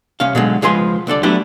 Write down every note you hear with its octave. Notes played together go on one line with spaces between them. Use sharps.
C2 C3 C#4 F5
B2 D3 F#3 G#3
C#2 F3 G#3 G#4 B4 C6
C2 D3 A4 D5
F#3 A3 B3 D4 E4 G4